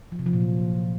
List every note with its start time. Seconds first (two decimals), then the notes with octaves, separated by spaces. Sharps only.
0.12 F3
0.19 C3
0.26 F3
0.33 A#2
0.41 F#3